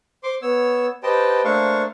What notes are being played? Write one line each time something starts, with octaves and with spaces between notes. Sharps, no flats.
C5 C6 D6
B3 C#5 E6
G4 B4 C5 D#5 G5 A5
A3 A#3 D4 C5 F5 C#6